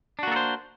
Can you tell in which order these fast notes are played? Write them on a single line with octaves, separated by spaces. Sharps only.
D4 F#4 A#3 A4 C5